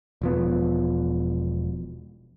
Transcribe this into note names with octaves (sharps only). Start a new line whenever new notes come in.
E1 F3 B3